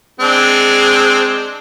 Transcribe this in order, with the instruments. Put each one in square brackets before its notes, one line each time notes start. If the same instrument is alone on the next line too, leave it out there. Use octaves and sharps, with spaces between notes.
[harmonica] G#3 C4 D4